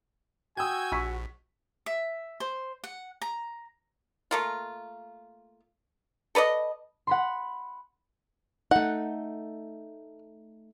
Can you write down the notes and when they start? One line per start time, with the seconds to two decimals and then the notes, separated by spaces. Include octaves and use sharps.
0.57 F#4 G5 G#5 D#6 E6 G6 G#6
0.92 A#1 C#6 E6 B6
1.86 E5
2.40 C5
2.84 F#5
3.22 A#5
4.31 A3 A#3 F4
6.35 A4 B4 D5 D#5
7.07 F#5 B5 C6
8.71 A3 D#4 F#5